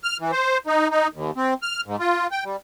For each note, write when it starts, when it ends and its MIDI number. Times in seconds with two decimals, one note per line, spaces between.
0.04 0.17 89
0.20 0.31 52
0.32 0.58 72
0.67 0.88 63
0.91 1.08 63
1.13 1.31 39
1.36 1.54 60
1.63 1.81 89
1.86 1.96 44
1.99 2.27 65
2.31 2.44 79
2.45 2.56 55